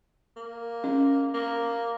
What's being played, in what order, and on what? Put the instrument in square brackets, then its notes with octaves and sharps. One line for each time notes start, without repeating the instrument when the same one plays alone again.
[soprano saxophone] A#3
[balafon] C#4
[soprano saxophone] A#3